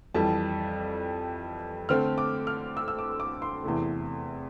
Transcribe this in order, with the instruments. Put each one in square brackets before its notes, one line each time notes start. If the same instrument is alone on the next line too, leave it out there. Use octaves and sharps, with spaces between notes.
[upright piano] F2 E3 G3 A5
D3 A3 C4 F6
D6
F6
E6
E6
D6
D6
C6
E2 C3 E3 A3